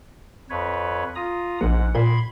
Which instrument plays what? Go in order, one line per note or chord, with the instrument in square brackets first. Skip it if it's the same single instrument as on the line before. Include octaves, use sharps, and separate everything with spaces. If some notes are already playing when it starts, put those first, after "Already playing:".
[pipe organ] F2 B4 C#5
F4 A#5 D#6
[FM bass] A#1 [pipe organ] G#2 F#5
[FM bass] A#2 [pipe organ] B5 C6 G#6